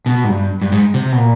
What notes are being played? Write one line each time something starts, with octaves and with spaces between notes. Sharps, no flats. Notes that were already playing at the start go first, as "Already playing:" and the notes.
B2
G#2
G2
G2
G#2
C3
B2
A#2